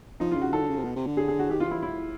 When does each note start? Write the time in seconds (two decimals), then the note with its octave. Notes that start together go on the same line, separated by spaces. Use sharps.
0.20 F3 D#4
0.31 F4
0.36 C#3
0.42 F#4
0.53 D#3 A4
0.61 D3
0.69 C#3
0.77 C3
0.84 B2
0.96 C3
1.07 D3
1.17 G#4
1.28 G#4
1.39 F#4
1.49 D#3 G4
1.60 F4
1.67 E3 E4
1.83 E4